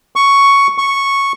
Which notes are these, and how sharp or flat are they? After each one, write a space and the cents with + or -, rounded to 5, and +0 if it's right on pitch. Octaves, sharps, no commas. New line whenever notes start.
C#6 +5
C#6 -5